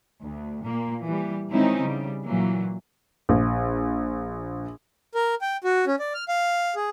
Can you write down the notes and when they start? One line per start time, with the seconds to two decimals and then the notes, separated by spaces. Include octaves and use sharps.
0.23 D2
0.65 A#2 A#3
1.03 E3 G3
1.52 D#3 G#3 C4 C#4 D#4 E4
1.81 C#3 G3
2.24 A#2 E3 F#3 A#3
3.29 A#1
5.15 A#4
5.41 G5
5.64 F#4
5.87 C#4
5.99 D5
6.14 F6
6.28 F5
6.76 G#4